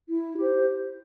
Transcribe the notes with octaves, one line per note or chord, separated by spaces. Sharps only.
E4
G4
C5